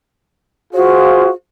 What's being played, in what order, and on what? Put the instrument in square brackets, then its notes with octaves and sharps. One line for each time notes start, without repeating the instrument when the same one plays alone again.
[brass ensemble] F4 G#4 C5 [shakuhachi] F#4